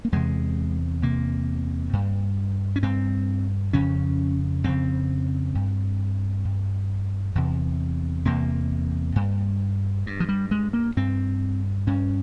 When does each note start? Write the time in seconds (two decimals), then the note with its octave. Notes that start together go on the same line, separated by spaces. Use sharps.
0.05 A#3
0.12 E2 C3 G#3
1.02 E2 C3 A#3
1.93 G2
2.76 C#4
2.83 G2 C4
3.73 F2 C#3 C#4
4.64 F2 C#3 C4
5.55 G2
6.45 G2
7.35 E2 C3
8.25 E2 C3 A#3
9.16 G2
10.06 G2
10.20 F3
10.29 G3
10.51 G#3
10.73 A#3
10.97 G2 C4
11.87 G2 C#4